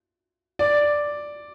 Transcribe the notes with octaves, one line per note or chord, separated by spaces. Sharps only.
D5